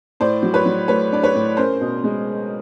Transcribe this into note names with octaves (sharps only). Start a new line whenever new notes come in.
A2 C5 D5
F#3
B4 C#5
F#3
A3 B4 C#5
D4 D5
B4 C#5
A2
C#4 A#4 C5
B2
G#3